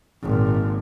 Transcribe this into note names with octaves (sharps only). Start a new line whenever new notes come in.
G#1 A#2